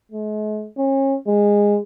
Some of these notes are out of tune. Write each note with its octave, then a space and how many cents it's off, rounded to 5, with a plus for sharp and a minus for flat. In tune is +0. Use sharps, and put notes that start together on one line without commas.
G#3 +45
C#4 -35
G#3 -15